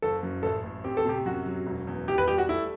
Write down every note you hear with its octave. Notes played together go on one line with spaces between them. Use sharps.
F#1 A4
F#2
A1 A4
A2
C4 G4
A4
C3 G4
F#2 F#4
F#3
E1
E2
E4 G4
B4
G3 G4
F#4
A3 E4